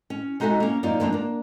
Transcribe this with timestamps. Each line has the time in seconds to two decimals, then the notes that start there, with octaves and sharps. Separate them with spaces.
0.10 C#4
0.40 G#3 D#4 F#4 A4 E5 G#5
0.60 A#3 C#4
0.83 F#2 A#3 D#4 F4 D5
1.00 F#2 F3 A#3 C4 D4
1.12 A#3 D4